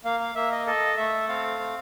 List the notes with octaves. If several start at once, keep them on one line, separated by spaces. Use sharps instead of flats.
A#3 F5
F5
A#3 E5
D#5
A4 D#5
A3 E5
C4 F5
C4